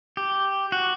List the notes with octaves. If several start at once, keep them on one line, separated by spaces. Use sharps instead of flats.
G4
F#4